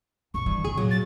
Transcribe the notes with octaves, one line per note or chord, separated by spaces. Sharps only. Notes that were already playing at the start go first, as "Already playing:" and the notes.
F#2 A#2 C#6
G2 E3
E2 C3 G#4
A#2 F#3
A6